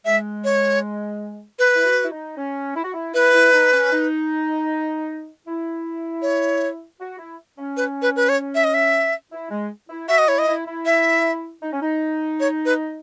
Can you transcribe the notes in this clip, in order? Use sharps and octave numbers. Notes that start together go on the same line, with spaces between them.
G#3 E5
C#5
B4
E4
F#4
E4
D#4
C#4
E4
F#4
E4
E4 B4
E4
D#4
C#4
D#4
E4
C#5
F#4
E4
C#4
B4
B4
B4
C#5
E5
D#5
E5
E4
G#3
E4
F#4 E5
D#5
E4 C#5
D#5
E4
E4
E5
D#4
C#4
D#4
C#5
B4